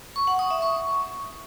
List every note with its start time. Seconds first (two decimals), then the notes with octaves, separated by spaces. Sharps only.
0.16 C#6
0.27 F#5
0.39 D#6
0.51 E5
0.62 C#6